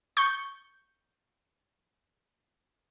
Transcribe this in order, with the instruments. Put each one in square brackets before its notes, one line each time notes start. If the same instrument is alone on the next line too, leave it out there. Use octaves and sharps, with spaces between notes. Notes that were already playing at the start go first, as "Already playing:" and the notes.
[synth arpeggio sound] C#6 G6